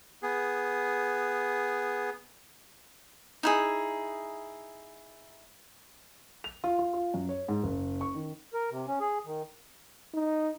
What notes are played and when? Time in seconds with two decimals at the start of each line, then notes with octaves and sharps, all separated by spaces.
0.23 B3 G#4
3.43 D#4 E4 G#4
6.44 F7
6.64 F4
6.79 F4
6.94 F4
7.14 F#2
7.29 C#5
7.48 G#2
7.63 F#1
8.01 C#6
8.15 D#3
8.54 A#4
8.71 C3
8.87 C#4
9.00 G#4
9.25 D#3
10.14 D#4